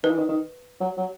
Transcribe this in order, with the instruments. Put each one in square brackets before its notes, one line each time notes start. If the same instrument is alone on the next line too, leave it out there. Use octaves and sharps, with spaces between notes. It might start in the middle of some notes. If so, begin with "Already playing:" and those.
[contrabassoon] D#3 [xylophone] B4
[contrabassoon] E3
D#3
D#3
F#3
F#3